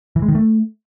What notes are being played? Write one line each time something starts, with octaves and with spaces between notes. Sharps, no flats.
E3
G#3
D#3
A3